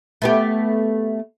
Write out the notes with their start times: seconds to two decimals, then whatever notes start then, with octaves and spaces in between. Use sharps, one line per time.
0.22 A3 B3 G4